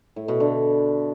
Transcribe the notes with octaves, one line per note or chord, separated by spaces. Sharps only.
A2
B2
D3